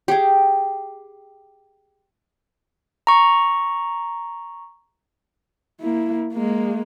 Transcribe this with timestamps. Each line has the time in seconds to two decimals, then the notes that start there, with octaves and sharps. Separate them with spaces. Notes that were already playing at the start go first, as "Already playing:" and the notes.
0.08 G4 G#4
3.07 A#5 C#6
5.80 A#3 E4
6.33 G#3 A#3